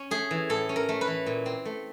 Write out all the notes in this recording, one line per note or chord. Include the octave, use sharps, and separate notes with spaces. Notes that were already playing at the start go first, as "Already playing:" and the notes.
Already playing: C#4
A3 G#4
E3
A2 A4
C#4
A#4
A3
B4
E3
A#2
C4
A3